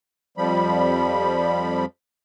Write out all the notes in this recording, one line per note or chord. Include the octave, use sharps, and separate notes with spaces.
F2 F3 G3 B5